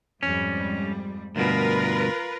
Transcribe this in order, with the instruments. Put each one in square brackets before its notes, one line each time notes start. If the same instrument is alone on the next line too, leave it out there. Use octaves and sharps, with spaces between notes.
[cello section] F2 G#2 G3 [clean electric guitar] C#4
[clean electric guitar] D2 G2 B2 [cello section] F4 A#4 B4